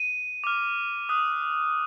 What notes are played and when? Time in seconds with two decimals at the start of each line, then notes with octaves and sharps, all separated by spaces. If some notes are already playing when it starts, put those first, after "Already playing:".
Already playing: D#7
0.44 D6 F6
1.09 D#6 F#6